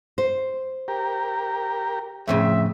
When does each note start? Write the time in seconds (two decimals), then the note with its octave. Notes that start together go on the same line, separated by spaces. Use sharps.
0.18 C5
0.88 G4 A#4
2.28 F2 A2 C#3 E5